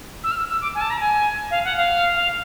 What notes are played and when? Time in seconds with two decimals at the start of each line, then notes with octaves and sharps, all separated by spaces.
0.24 E6
0.32 F6
0.37 E6
0.48 E6
0.61 D6
0.75 G#5
0.81 A5
0.90 A#5
1.00 G#5
1.51 F5
1.64 F#5
1.77 F5
2.15 F5